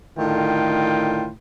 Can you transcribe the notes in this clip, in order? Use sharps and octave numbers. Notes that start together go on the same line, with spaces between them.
A2 D3 D#3 F4 G5